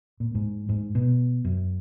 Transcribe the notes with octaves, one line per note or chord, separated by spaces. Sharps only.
A#2
G#2
G#2
B2
F#2